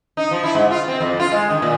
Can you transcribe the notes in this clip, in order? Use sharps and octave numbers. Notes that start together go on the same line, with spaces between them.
D#4
F3
E4
G#2
F4
C4
F2
F4
G#3
D#3
A#2